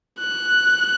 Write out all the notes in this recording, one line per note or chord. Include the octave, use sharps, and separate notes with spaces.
F#6